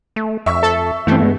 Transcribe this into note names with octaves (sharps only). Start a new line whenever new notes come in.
A3
F2 E5 C#6 E6
A4
G2 E3 A3 C4
G#3 B3